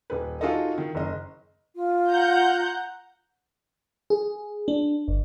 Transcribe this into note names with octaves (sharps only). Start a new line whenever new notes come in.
D#1 B4
D#4 F4 F#4 G#4 A4 D#5
D#3
F#1 D#5
F4
F#5 A#5 G6
G#4
D4
G1